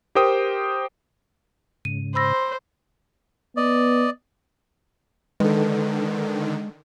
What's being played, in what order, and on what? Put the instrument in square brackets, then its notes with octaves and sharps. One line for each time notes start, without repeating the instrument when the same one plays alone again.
[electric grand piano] G4 A#4 C5 G5 D#6
[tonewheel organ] G#2 C#3 [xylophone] D#7
[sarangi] C5 [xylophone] B5 E6 A#6
[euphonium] B3 [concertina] D5 D#5
[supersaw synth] D3 D#3 [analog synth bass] G#3 [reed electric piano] A4 B4